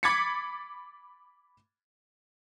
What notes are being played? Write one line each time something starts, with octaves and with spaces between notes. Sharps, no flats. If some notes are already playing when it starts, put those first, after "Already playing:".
B5 D6 G#6 A6 B6 C#7